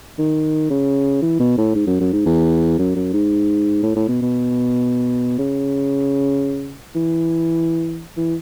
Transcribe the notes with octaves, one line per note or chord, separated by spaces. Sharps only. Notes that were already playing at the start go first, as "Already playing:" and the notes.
D#3
C#3
E3
B2
A2
G#2
F#2
F#2
G#2
E2
F#2
F#2
G#2
A2
A2
B2
B2
C#3
E3
E3